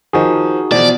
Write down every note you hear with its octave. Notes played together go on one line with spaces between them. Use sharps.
D#3 F3 D#4 F#4 G#4
B2 E3 F3 D5